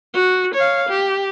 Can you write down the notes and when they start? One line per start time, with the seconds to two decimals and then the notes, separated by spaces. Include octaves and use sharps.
0.14 F#4
0.55 C#5 F5
0.89 G4